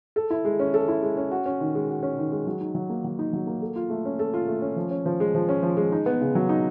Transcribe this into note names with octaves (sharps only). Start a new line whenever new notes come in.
A4
E4
G#3
C#4
A4
E4
G#3
C#4
F#4
C#4
D#3
G#3
F#4
C#4
D#3
G#3
F#3
D#4
F#3
A#3
F#3
D#4
F#3
A#3
A4
F4
A3
C#4
A4
F4
A3
C#4
F3
C#4
F3
G#3
F3
C#4
F3
G#3
D#4
B3
C#3
F#3
D#4